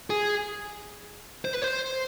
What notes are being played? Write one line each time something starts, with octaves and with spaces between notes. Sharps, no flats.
G#4
C5
B4
C5